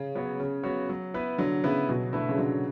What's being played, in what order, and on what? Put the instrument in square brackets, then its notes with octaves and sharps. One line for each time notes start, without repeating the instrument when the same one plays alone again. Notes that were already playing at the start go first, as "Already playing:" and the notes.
Already playing: [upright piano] C#3
[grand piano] F#3 B3 F#4 C#5
C#3
F#3 B3 F#4 C#5
F#3
B3 E4 B4
[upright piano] D3 [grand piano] F#3
[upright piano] C#3 [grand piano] B3 E4 B4
[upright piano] B2 [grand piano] F#3
[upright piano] D3 [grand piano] A3 E4 B4
[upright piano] C#3
[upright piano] D3 [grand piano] F#3